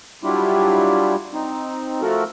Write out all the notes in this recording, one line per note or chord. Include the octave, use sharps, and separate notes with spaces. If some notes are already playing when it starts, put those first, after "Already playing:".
F#3 G3 D4 E4 F4 G4
C4 D#4
F3 A3 F#4 A4 A#4